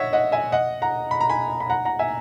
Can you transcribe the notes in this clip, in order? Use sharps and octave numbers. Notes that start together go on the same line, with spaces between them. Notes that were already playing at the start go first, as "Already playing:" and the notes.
Already playing: C#5 D#5 E5 F#5
D#5 F#5
E5 G#5
D#5 F#5
F#5 A#5
B5
A#5
G#5 B5
B5
F#5 A#5
F#5 A#5
E5 G#5